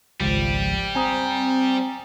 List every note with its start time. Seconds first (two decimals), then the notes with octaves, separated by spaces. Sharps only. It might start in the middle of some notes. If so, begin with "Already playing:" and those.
0.20 G#1 C#2 F3 G3
0.95 C4 G#5 A#5 D#6